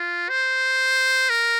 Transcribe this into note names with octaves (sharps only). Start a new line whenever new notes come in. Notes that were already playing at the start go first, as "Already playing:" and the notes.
Already playing: F4
C5
A#4